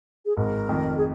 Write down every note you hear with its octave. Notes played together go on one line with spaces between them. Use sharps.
G#4
G#1 G#2 G#3 A#4
F1 F2 D#3
G#4